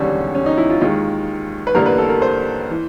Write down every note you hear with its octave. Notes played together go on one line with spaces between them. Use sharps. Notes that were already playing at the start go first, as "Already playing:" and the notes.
Already playing: E1 D#2 D3 G3 C#4
C#4
D#4
E4
F4
D#2 D#3 G#3 F4
B4
A1 G2 D3 G3 A#3 A#4
B4
A4
A#4
C5
E3